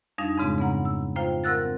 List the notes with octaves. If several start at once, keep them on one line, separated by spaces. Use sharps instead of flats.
F2 G3 D4 D#4 F5
F2 G#2 C#3 G#3 C4
C#3 B3 F#5 A#5
E6
F4 C5 F5 G5 A#5
C4 A#4 F#5 E6 F#6 A6